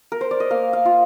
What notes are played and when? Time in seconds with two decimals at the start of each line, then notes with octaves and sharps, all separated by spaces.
0.12 A#4
0.21 C5
0.31 D5
0.40 D#5
0.50 A#3 F5
0.73 F5
0.85 F4